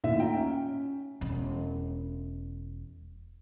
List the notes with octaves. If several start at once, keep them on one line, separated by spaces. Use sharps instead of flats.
D#2 A2 E5
D#4 F4 G5 A#5
C#4
E1 C#4